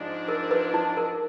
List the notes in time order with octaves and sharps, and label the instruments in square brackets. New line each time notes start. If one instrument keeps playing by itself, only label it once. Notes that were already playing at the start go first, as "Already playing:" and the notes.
Already playing: [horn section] G#2 F3 G#3 D4
[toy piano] A#4
B4
D#4
A#4